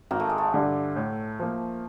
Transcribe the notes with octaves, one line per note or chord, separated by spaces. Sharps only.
G#1 A#3
A3
G#3
A3
G2 D3
A2
F3 A#3